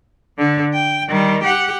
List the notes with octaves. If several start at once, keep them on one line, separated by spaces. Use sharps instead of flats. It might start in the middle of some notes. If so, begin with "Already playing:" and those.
D3
G5
D#3 G3
G4 F#5